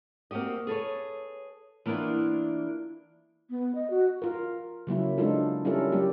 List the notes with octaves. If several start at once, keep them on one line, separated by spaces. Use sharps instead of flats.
A#3 C4 F#4 G4 D#5
G#4 A4 B4 C#5
E3 A#3 B3 D4 E4 F4
B3
D#5
F#4
F4 A#4
C#3 F#3 A#3 E4
G#3 D4 D#4 F4 A4
G3 C#4 E4 F4 A4 A#4
F#3 G3 A#3 G4